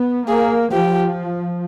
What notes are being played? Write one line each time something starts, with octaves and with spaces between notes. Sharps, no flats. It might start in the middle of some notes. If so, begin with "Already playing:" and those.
Already playing: B3
A#3 G#4
F3 G4